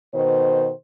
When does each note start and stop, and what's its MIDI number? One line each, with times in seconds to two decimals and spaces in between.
0.14 0.70 47
0.14 0.70 51
0.14 0.70 72